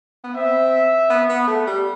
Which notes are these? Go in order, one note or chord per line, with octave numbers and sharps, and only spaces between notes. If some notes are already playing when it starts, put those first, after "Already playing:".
B3
C4 E5
B3
B3
A3
G3